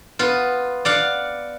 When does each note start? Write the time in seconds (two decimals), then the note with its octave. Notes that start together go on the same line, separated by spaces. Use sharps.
0.19 B3 F4
0.85 D5 F5 F#5